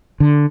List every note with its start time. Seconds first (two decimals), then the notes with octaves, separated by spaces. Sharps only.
0.20 D3